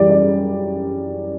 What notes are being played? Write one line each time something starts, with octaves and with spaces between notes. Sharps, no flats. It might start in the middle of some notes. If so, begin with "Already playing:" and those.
Already playing: F#2 E3 G3 D5
D5